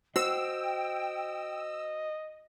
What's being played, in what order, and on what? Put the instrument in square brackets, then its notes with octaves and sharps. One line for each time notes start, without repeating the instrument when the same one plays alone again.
[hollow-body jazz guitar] F#4 C5 [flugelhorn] D#5 [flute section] G5 [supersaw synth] E6